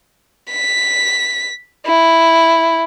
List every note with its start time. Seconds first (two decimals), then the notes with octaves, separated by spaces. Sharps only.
0.52 B6
1.86 E4